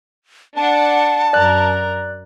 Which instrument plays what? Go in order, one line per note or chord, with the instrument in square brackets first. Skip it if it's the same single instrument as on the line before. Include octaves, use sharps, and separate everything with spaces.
[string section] D4 F#5 [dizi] A5
[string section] F#2 A#4 [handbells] D5 F#6